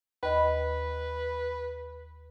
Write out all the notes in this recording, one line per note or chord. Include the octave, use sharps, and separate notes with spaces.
D#2 B4 D#5 B5